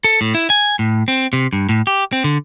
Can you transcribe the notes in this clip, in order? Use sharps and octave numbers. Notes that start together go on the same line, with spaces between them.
A4
A2
E4
G#5
A2
C4
C3
G2
A2
G4
C4
D3